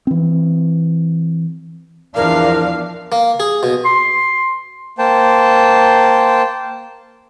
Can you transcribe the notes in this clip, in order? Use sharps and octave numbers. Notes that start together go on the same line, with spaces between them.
E3 C4
E2 F3 D4 A#4 F5
A#3
G#4
B2
C6
A#3 C5 G5 A5